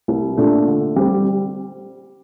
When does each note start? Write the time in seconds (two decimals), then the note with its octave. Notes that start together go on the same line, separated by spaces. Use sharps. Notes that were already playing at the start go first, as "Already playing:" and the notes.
0.08 C2
0.37 A#2 A3 D4
0.67 D3
0.96 G3 C4